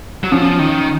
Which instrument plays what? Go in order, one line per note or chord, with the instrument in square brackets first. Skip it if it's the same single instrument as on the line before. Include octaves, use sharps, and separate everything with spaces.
[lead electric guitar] F#3
[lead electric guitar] F3 [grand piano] C#4
[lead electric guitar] D#3